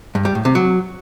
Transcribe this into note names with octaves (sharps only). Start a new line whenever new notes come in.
G2
G3
A2
C3
F#3